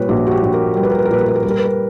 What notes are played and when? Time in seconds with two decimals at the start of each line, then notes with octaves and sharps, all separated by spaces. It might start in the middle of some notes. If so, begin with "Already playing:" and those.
Already playing: A#2 G3 B4 C#5
0.09 A#1 F#4
0.27 F#4
0.31 G4
0.43 A#1
0.54 A#4
0.77 G3 A#4
0.83 B4
0.91 A#4
0.99 B4
1.05 A#4
1.10 A#2 B4
1.21 A#4
1.28 B4
1.36 A#4
1.43 G3 B4
1.50 A#4
1.58 B4
1.65 A#4